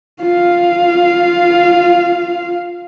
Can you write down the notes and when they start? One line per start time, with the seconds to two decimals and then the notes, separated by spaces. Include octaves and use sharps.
0.21 F4 F5